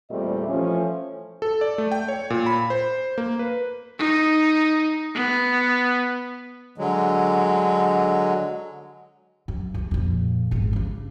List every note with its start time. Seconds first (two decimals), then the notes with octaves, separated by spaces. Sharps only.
0.10 E2 A#2 G3 A3 C4 D#5
0.48 E3 F3 A3 C#4
1.42 A4
1.61 D5
1.78 A3
1.92 G5
2.08 C#5
2.30 A#2
2.46 B5
2.70 C5
3.18 A#3
3.39 B4
3.99 D#4
5.15 B3
6.78 D3 F#3 G#3
9.48 F#2
9.74 C#2 F#2
9.91 F2 A#2
10.51 G#1 E2
10.73 C#3 D4